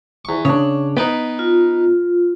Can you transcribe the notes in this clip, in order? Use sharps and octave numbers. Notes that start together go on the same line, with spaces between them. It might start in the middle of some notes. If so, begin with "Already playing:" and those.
E2 C#6
C#3 D4 C#5
B3 D#4 B4 G5
F4